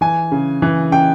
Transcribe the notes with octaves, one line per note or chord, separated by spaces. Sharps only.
E3 G#5
C#3
E3
C#3 G5